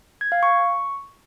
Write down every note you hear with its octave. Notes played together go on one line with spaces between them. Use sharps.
G#6
F5
C#6